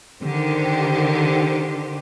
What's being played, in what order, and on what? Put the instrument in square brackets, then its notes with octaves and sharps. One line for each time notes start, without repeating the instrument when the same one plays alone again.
[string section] D3 D#3 G4 C5